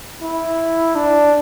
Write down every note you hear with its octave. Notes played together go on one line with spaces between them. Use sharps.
E4
D4